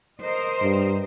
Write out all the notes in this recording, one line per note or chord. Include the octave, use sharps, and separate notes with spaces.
A#4 C5 D#5
G2